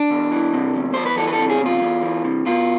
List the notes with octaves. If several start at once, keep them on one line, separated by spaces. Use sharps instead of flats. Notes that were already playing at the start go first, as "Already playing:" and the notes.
Already playing: D4
E2
E3
C3
E2
E2 C5
B4
E3 A4
B4
A4
C3
G#4
E2 F4
E2
E3
C3
B2 F4